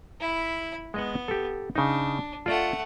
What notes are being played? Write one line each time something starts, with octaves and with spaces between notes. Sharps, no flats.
E4 B5
G#3 B3 D#5 F#5
G4 A4
C#3 D4 D#4
A3 F4 D5 F#5